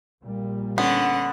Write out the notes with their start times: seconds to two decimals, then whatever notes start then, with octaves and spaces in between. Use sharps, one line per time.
0.22 A#1 A#2 G3
0.78 D3 B3 C#4 F#5